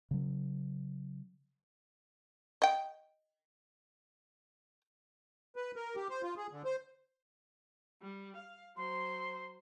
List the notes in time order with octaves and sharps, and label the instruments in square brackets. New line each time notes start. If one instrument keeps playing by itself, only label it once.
[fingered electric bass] C#3 F#3
[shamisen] D#5 G5
[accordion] B4
A#4
G4
C5
F4
G#4
D3
C5
[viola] G3
F5
[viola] F#3 C5 [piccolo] C6